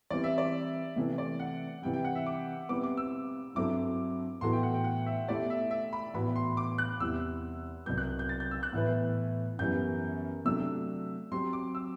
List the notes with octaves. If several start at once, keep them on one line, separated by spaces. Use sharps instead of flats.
E3 G3 C4 D5
E5
D5
C3 E3 A3
D5
F#5
C3 E3 G3 G5
G5
F#5
E5
D6
B2 G3 C4 E4 B4 D6
D6
E6
G2 F#3 C4 E4 A4 D6
A2 E3 B3 F#4 A4 C6
G5
F#5
G5
F#5
E5
B2 A3 E4 G4 D5
E5
E5
B5
A2 E3 B3 F#4 B5
C6
D6
F#6
E2 C3 E3 G3 E6
C2 B2 F#3 B3 G6
F#6
G6
A6
G6
E6
F#6
A2 E3 B3 E4 B4
F#2 E3 G3 B3 G6
C3 F#3 A3 D4 E6
F#3 C4 G4 C6
D6
E6